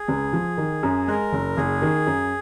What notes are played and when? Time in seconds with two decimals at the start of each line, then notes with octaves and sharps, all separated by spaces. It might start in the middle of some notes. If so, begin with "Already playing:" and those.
Already playing: G#4
0.08 C#2
0.33 F3
0.58 D#3
0.83 F#2
1.08 G#3 A#4
1.32 F#1
1.57 F#1 G#4
1.82 D#3
2.06 F#2